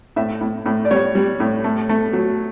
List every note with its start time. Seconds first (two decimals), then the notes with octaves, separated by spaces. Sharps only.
0.16 A2 E5
0.41 A2
0.66 A2
0.85 D5
0.91 G3 C#5
1.15 G3
1.40 A2
1.64 A3
1.89 A3
2.13 F#3